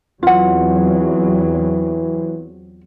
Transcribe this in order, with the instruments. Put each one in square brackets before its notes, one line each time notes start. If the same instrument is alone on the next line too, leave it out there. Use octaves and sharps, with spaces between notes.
[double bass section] E2 F#3 C4 [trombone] E3 [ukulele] F4 F#5